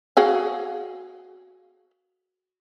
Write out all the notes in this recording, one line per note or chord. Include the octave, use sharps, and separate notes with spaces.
F#4 G#4 F5